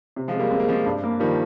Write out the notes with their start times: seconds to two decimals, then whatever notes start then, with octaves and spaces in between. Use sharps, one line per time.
0.16 C3
0.28 F3 G#3
0.34 C3
0.39 G3 A#3
0.51 G#3 C4
0.60 A#3
0.69 F3 G#3 C4
0.86 G2
1.04 A#3
1.20 D#3 F3 G3